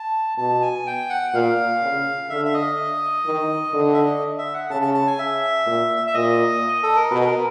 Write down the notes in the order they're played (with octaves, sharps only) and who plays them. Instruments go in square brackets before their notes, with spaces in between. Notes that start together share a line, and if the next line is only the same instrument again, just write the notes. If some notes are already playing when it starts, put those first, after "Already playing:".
Already playing: [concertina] A5
[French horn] B2 [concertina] A5
[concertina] G#5
G5
F#5
[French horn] A#2 [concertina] F5
[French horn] C#3
[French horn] D3 [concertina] E5
[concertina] E5
D#5
[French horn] D#3
D3
[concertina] E5
D#5
E5
F#5
[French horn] C#3 [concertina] A5
[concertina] A5
A5
G#5
E5
[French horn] A#2
[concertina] E5
[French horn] A#2 [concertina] D#5
[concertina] A4
A#4
[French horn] B2 [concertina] B4
[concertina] A#4